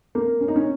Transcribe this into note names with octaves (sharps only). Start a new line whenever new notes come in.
A#3
C#4
D#4
C#4